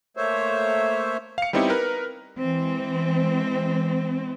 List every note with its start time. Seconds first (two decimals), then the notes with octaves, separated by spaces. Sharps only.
0.17 A3 A#3 C5 C#5 E5
1.38 F5 C#7
1.53 G3 B3 C4 D#4 E4 G4
1.70 A#4 B4
2.37 E3 G#3 C4